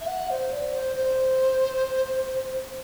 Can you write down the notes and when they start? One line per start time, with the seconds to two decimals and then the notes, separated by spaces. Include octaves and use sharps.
0.01 E5
0.07 F#5
0.30 C5
0.52 D5
0.74 C5
0.96 C5